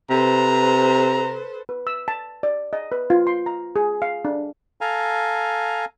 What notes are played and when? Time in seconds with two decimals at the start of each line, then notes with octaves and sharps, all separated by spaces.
0.10 C3 A4 B4 C5 A#5
1.69 B4
1.87 E6
2.08 A5
2.43 D5
2.73 D#5
2.92 B4
3.10 F4
3.27 C6
3.46 A#5
3.76 G#4
4.02 F5
4.25 D4
4.81 A4 F5 G#5 A#5